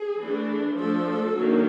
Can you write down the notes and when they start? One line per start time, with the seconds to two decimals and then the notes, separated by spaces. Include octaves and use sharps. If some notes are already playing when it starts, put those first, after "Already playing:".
Already playing: G#4
0.19 E3 A3 D4
0.78 F3 A3 D4 A4
1.36 D#3 F#3 A#3 D4